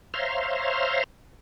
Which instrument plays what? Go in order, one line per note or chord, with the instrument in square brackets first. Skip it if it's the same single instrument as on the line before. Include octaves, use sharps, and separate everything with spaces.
[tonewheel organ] C5 C#5 E5 F5 A#5 C6